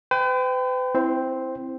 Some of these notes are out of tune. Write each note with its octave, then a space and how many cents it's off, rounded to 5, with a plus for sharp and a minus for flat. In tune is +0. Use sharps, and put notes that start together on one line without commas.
B4 +45 G5 +0
C4 +0 E4 +0 C5 +0